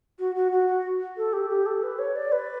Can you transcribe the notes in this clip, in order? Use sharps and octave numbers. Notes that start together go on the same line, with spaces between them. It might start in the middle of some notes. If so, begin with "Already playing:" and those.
F#4
F#4
F#4
A4
G4
G4
A4
B4
C#5
D5
B4